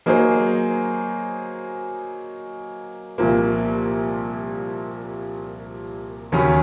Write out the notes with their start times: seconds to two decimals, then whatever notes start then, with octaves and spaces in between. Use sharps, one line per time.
0.06 F#3 A#3 D#4 G#4 C5
3.18 C2 A#2 F3 A#3
6.32 D#2 C#3 F#3 C#4